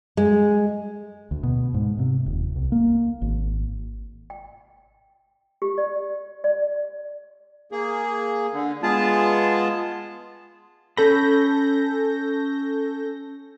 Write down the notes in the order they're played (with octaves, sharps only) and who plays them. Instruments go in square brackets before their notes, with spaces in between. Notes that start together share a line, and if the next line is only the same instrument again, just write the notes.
[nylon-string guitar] G#3
[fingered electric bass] D2
B2
G#2
C3
D#1
C2
A#3
G#1
[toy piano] G5
G4
D5
D5
[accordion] A#3 G#4
D3
G#3 B3 F4 G#4 A5
[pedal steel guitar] C#4 B5 [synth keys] A4 G6 A#6